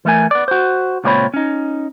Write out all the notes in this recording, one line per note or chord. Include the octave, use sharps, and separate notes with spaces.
E3 A3 A#4 G#5
B3 D5
F#4 C5
C#2 A#2 A#3 C4 C#5 B5
C#4 D#4